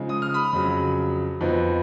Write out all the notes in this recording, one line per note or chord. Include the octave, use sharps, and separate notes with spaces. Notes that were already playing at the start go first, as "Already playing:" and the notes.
Already playing: C#3 F3 G#3 D#4
D#6
F6
B5 D#6
F2 C#3 F#3
F2 F3 B3 D#4